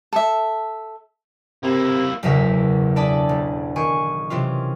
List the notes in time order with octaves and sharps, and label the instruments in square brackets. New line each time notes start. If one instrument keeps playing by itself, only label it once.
[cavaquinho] A4 E5
[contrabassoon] C3 [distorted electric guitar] A#3 E4
[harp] F#1 B1 E2 C#3 A#4 E5
D4 G#4 A4 D5 A5 B5
E1
D#3 G#5 C#6
C3 E3 C#4 F4